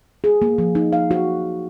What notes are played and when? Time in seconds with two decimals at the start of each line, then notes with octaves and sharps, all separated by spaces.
0.24 G#4
0.42 A#3
0.58 F3
0.75 D#4
0.93 F5
1.11 F#4